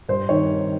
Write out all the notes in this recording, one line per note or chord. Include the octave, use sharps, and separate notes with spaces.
G2 C5
D#3 C#5